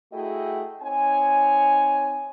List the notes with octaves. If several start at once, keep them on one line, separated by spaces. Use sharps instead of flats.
A3 E4 F#4 G#4 D#5 G5
C4 D#4 C#5 G#5